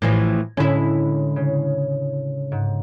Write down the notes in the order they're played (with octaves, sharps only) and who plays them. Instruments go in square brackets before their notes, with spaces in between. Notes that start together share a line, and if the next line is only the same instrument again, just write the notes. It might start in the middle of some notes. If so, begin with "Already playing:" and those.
[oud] A2 E3 F3 [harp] G#6 A#6
[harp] A2 D3 G#3 [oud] C#4 E4
[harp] C#3
G#2